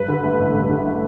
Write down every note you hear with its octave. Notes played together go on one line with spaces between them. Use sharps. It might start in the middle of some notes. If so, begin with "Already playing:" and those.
Already playing: G2 B4
D3
A3
A1
G2
D3
A3